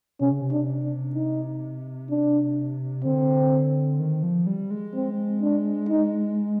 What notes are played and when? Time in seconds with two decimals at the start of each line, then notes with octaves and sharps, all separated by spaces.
0.20 C3 C#4
0.31 C#3
0.42 C3
0.51 D4
0.83 D4
1.15 D#4
2.10 D4
3.05 D3 C4
4.00 D#3
4.23 F3
4.47 G3
4.71 G#3
4.95 C4
5.42 D4
5.89 D#4